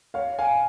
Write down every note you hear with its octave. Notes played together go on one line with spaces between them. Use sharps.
C#5 F5
F5 G#5